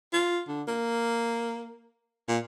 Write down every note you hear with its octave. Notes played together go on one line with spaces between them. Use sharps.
F4
D3
A#3
A#2